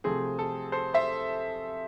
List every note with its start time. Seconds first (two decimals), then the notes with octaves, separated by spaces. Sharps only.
0.04 C3 F3 A3 C4 G#4
0.39 A4
0.72 A4 C5
0.94 C5 E5